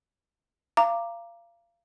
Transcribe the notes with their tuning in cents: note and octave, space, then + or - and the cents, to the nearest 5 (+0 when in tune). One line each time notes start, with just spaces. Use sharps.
F5 -30 A#5 +0 D6 +0